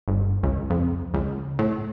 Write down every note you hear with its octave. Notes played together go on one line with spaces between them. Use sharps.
G1
C#2
F2
C#2
A2